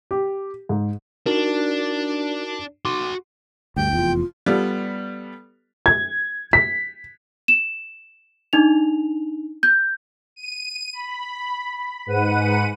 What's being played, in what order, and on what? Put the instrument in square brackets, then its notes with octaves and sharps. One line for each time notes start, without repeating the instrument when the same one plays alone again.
[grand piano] G4
G#2
[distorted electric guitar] D4 [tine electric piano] D#4 F#4 A#4
[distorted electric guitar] F#4 C6 [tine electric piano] D6
[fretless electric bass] D2 G2 [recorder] G5
[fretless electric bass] F1 E2 [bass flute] F4
[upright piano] G3 B3 F4 A4 D5
G#6
B6
[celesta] E7
D4 D#4 F7
G6
[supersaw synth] D#7
B5
G#2 B4 F#5 D#7